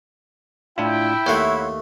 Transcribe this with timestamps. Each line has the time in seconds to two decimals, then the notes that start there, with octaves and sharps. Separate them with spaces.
0.78 A2 D4 E4 F4 G5
1.26 D#2 A3 C#5 F#5 C6